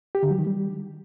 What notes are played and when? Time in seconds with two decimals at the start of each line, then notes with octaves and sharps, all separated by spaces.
0.15 G4
0.23 D3
0.31 F#3
0.39 D#3
0.47 G3